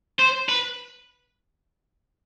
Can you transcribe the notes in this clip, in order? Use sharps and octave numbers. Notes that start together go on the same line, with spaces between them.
C5
B4